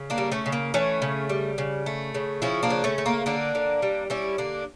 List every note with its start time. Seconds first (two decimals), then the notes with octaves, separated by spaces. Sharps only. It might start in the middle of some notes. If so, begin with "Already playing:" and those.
Already playing: C#3
0.10 A#3 D4
0.18 G3
0.32 A3 C#4
0.46 C#3
0.52 A#3
0.74 E3 A3 C#4
1.02 C#3
1.29 G3
1.58 C#3
1.86 A3
2.14 C#3
2.42 F3 C#4 E4
2.63 A#3 D4
2.70 C#3
2.84 A3 C#4
2.98 A3
3.06 A#3
3.26 D3 A#3 D4
3.55 D3
3.82 G3
4.10 G3 C#4 E4
4.38 D3 A#3 D4